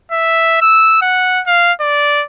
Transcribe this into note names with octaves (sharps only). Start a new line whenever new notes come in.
E5
E6
F#5
F5
D5